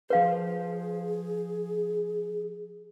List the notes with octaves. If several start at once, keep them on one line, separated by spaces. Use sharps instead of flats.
F3 G#4 B4 C5 F5